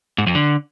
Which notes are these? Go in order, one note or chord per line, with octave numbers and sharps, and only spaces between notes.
G#2
F2
D3